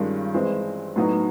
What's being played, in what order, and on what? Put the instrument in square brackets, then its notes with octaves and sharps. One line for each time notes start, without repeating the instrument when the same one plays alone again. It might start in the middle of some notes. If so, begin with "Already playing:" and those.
Already playing: [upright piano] G2 D#3 G#3 C#4 F4
E3 G#3 C4
A2 F#3 B3 D#4 F#4